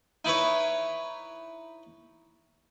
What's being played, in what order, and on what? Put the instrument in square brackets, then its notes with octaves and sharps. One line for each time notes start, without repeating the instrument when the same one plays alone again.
[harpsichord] D#4 E4 B4 C#5